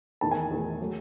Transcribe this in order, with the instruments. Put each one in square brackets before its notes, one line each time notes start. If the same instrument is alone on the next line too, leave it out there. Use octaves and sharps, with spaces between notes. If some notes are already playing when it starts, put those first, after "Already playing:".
[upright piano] E2 D#3 A3 A5
G#5
E2 D#3 A3
F#3 A3